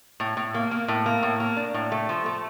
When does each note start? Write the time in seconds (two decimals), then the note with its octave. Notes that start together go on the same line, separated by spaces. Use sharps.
0.20 A2
0.37 A2
0.54 A#3
0.71 A#3
0.88 A2
1.06 A#3
1.23 A2
1.40 A#3
1.57 D4
1.74 A2
1.92 A3
2.09 F3
2.26 A3